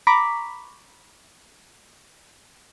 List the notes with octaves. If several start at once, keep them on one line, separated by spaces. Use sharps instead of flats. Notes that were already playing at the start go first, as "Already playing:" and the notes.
A#5 B5 C#6 D6 B6